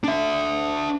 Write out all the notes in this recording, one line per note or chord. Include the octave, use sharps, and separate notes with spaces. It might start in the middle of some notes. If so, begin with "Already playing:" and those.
D4 E5